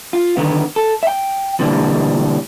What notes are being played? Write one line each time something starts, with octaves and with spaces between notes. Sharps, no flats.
F4
D3 D#3 B3
A4
E5 G5
B2 D3 E3 G3 A#3